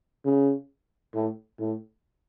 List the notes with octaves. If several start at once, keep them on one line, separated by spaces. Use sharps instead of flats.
C#3
A2
A2